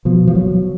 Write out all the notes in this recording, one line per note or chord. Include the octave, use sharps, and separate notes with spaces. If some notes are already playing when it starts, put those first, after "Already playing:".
B2 F3
F3
F#3